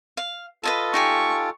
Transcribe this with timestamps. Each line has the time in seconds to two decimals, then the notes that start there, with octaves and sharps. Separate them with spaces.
0.17 F5
0.63 F4 A4 B4 D#5 A5
0.94 D#4 G4 G#5 C#6